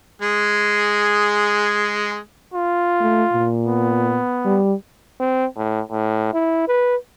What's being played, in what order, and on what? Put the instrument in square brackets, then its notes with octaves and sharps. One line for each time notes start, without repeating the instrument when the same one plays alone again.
[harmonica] G#3 G#4
[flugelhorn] F4
[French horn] A3
A#2
[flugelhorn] B3
[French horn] G3
[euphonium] C4
A2
A2
E4
B4